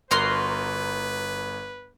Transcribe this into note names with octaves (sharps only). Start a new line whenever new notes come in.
G1 F#4 A#4 B4 C6